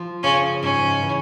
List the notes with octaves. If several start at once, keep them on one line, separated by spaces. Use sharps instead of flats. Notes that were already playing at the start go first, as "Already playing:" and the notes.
Already playing: F3
C#3 C#4
G#2 C#4
E3